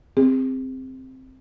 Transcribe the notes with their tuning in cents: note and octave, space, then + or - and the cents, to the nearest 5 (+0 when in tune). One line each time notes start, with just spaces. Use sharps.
C4 +0 G#4 -40